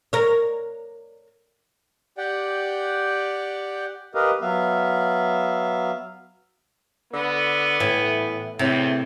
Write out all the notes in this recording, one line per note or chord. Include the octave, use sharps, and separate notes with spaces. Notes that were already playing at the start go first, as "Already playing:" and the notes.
A#4 C#5
G4 D5 F#5 G5
G4 A#4 B4 D#5 F5
F#3 B3 E5 F5
D3 B3
A2 E3
E2 A2 C3